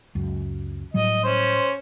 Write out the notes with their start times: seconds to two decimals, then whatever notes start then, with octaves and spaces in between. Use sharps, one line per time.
0.15 C#2 F#2
0.94 A2 F#3 G3 D#5
1.24 C#4 C5